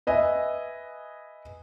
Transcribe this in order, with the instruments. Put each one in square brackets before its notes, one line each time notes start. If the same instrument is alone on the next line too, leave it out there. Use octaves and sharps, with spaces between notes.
[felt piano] B4 D#5 E5 G#5